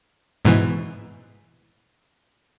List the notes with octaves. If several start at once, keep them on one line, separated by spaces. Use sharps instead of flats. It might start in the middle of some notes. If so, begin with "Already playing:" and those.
G#2 B2 E3